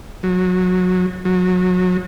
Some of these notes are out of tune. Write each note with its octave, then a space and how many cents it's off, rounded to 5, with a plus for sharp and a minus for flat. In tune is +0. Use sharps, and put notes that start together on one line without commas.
F#3 -20
F#3 -25